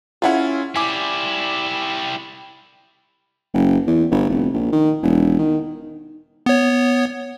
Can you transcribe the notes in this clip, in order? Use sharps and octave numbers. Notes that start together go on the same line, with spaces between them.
C#4 E4 F4 G#4 E5 F#5
G3 E4 G#5 D6
F#1
E2
G1
F1
A#1
D#3
E1
D#3
B3 C#5